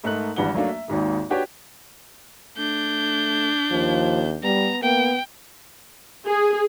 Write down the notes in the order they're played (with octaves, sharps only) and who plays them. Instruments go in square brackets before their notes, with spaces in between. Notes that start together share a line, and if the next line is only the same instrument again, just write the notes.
[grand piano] G#2 A3 A#4 D#5 F#6 F#7
G#1 G2 E3 F#5 G7
F#3 A3 A#3 D4
E5
G#1 D#2 G#2 D#3
D4 F#4 G4 B4 C#5 G5
[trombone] A3 [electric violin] D4 G6
[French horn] D#2 [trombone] F3
[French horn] G3 [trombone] B3 [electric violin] A#5
[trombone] A#3 [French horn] B3 [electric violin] G5
[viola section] G#4